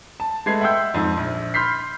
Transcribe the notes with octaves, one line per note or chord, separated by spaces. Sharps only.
A5
G#3 A3 B4 G#6 C7
E5 F#5 G5 C6 E6 G6
F2 G#2
A#1
B5 C6 F6 G6 B6 C7